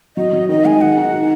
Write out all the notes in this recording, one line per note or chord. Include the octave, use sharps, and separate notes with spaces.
F#3 D#5
F#3
D#3 D#5
G#3 G#5
D#3 F#5
D#4
D#3